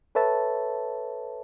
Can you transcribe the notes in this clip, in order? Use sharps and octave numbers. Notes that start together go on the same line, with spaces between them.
A4 B4 C#5 E5 A5